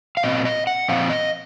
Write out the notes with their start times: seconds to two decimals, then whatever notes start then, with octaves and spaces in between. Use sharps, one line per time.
0.17 F5
0.23 A#2 F#3 C4 D#5
0.45 D#5
0.67 F#5
0.88 A#2 F3 C4 F5
1.10 D#5